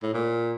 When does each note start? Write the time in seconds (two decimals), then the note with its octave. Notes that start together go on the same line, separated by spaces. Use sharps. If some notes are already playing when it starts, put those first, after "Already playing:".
0.03 A2
0.13 A#2